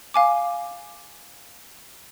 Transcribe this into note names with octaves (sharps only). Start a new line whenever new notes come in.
F5 G#5 D6